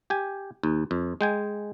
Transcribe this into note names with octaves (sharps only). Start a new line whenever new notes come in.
G4 G#5
D#2
F2
G#3 G5 G#5